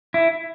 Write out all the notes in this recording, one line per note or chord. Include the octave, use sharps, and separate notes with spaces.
E4